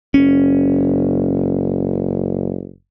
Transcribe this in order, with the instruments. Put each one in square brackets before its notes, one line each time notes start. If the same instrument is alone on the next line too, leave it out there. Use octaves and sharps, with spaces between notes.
[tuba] F#1 [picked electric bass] C#4